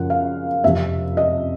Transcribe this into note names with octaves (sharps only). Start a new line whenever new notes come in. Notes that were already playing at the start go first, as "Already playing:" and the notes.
Already playing: F#2 C#3 F3 F#5
F5
F2 C3 F3 E5
D#5